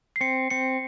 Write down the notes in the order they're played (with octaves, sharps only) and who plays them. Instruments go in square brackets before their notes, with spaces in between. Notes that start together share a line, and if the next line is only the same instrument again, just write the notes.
[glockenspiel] C7
[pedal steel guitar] C4 [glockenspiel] C#7
[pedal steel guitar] C4 [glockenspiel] C#7